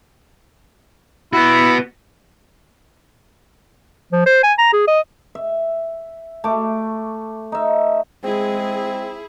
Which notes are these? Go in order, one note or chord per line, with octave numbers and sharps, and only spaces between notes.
B3 E4 F#4
F3
C5
G#5
A#5
G#4
D#5
E5
A3 D6
D#4 E5
G#3 C4 E4 G#4